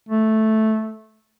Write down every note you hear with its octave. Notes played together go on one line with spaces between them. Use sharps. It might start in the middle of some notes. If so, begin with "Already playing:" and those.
A3